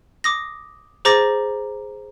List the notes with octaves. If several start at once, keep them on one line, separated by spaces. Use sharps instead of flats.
D6 D#6 A#6
G#4 C5 A#5 D6 A6 A#6